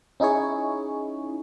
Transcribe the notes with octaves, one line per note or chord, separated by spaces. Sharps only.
C#4 D#4 E4 G#4 C#5